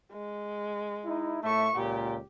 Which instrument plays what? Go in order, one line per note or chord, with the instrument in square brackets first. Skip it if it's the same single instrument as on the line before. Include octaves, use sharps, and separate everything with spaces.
[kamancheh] G#3
[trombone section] D#4 E4
[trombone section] A2 A3 [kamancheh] E5 C#6
[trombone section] C#2 A#2 [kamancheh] G4